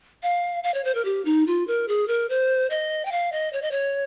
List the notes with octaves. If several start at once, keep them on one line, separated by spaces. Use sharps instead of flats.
F5
F5
C#5
C5
A#4
G4
D#4
F4
A#4
G#4
A#4
C5
D#5
G5
F5
D#5
C#5
D#5
C#5